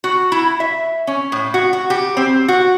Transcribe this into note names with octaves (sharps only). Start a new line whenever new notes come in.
F#4
E4
E5
C#4
A2
F#4
F#4
G4
C4
F#4